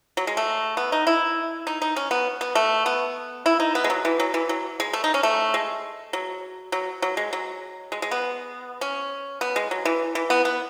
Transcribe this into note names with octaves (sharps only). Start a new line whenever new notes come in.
F#3
G#3
A3
B3
D#4
E4
D#4
D#4
C#4
B3
B3
A3
B3
E4
D#4
B3
G#3
F#3
E3
F#3
E3
F#3
G#3
A3
D#4
C#4
A3
G#3
F#3
F#3
F#3
G#3
F#3
G#3
G#3
B3
C#4
B3
G#3
F#3
E3
E3
B3
B3